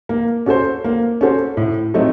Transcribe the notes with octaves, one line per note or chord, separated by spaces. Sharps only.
A#3
C#4 F#4 A4 C5
A#3
C#4 F#4 A4 C5
A2
F#3 A3 C4 D#4